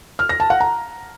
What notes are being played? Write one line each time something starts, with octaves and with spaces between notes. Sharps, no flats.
F6
A#6
A5
F#5
A#5